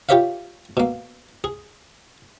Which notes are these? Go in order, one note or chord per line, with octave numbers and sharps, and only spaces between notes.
F4 G4 A#4 C#5 E5 F5
B2 A#3
G#4